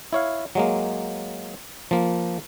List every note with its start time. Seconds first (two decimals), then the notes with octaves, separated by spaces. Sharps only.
0.13 E4 C#5 F5
0.55 F#3 G#3 A#3
1.91 F3 A#3